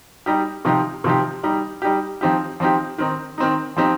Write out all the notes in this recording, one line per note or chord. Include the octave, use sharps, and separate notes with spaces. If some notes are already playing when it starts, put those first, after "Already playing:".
G3 D#4 G4
C3 F3 D#4 G4
C3 F3 D#4 G4
G3 D#4 G4
G3 D#4 G4
F3 C4 D#4 G4
F3 C4 D#4 G4
D#3 C4 D#4
D#3 C4 D#4
F3 C4 D#4 G4